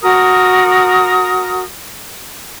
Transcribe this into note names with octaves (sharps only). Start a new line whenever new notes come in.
F#4 A#4 D#6